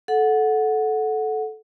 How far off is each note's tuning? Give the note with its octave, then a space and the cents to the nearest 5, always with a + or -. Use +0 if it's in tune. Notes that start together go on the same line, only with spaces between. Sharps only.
A4 -15 F#5 -10